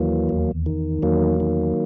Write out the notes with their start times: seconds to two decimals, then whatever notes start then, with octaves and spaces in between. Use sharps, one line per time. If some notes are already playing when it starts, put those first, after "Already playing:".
Already playing: D#2 E3 F#3 A#3
0.29 E2
0.66 D#3
1.02 E2 F#3 A#3
1.40 D#3